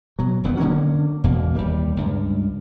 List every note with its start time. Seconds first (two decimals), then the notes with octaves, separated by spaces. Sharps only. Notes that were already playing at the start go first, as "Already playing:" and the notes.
0.19 B2 F#3
0.44 D#1 F2 B3 C4
0.57 D3 F#3 A#3 C#4
1.24 E1 E2 B2 A#3
1.56 D#2 G3
1.96 C#2 G2